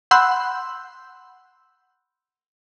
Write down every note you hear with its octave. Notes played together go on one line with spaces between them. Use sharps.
F#5 B5 C6 E6 F#6 G6